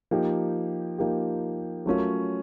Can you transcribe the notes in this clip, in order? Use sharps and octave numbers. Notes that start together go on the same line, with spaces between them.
F3 A#3 D#4 G4
F3 A#3 D#4 G4
F#3 A3 C#4 F4 A#4